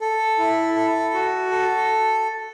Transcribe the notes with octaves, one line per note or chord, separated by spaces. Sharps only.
A4
E4
A4
F#4
A4